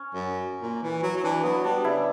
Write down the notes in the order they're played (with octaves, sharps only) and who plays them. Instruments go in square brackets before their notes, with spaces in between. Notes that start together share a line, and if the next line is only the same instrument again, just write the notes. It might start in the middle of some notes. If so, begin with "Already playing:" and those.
Already playing: [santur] C#4
[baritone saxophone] F#2
A#2
E3
F#3
F#3
[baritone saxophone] E3 [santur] D4
[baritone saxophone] F#3 [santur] B3
[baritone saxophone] G3 [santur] D4
[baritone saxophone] C#3 [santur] E4